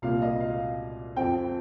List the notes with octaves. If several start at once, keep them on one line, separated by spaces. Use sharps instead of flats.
C2 A#2 A#3 F5
D#5
F5
F2 F3 C4 G5